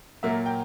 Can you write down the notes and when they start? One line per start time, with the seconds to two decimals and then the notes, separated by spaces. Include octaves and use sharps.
0.23 A#2 F#3 A#3 E5
0.46 G5